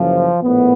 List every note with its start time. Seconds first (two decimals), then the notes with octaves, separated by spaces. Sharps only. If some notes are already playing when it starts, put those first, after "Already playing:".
Already playing: F#1 F#2 C#3 E3 F3
0.42 A#1 A2 B3